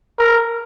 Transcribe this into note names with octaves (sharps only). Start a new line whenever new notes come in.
A#4